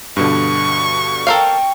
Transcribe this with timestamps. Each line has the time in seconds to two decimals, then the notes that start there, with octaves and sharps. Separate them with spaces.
0.17 G2 B2 D3 C#6
1.27 G3 C4 A4 A#4 F5